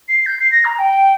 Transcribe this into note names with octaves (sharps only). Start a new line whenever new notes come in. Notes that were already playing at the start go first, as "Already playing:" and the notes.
C7
G6
C7
A#6
A#5
G5